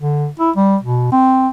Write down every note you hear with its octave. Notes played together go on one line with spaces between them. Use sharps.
D3
E4
G3
B2
C4